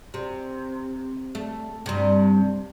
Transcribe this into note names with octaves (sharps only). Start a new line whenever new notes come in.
C3
A3
G2 C3